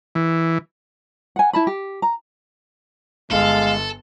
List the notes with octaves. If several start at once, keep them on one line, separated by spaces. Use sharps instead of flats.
E3
F#5 G#5
E4 A5 B5
G4
A#5
G1 G#3 A4 F5